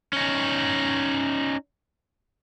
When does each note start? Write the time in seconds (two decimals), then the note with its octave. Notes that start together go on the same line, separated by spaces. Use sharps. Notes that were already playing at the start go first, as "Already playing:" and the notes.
0.13 C#4 D#4